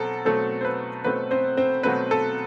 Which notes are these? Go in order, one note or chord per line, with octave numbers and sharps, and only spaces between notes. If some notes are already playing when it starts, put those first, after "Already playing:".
Already playing: B2 F#3 C4 A4
B2 F#3 A3 C4 A4
C5
B4
B2 F#3 A3 C4 B4
C4 C5
C4 C5
B2 F#3 A3 C4 B4
A4